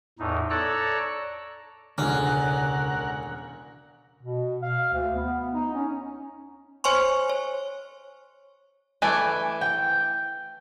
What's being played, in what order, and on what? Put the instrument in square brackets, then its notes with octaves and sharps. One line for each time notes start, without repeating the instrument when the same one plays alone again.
[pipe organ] E2 A2 D#4
A4 C#5 D5 A#5 E6 F#6
[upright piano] E1 D3 F6 [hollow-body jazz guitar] C#2 [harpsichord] C#4 [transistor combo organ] A#4 F#5
[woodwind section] B2
F5
D2
B3
D#4
C#4
[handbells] C5 C#5 G#5 C6 C#6
C#5
[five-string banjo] E3 A3 [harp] G#5 D6
[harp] G5